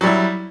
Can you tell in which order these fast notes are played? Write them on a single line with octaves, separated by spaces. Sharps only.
F#3 G3 E4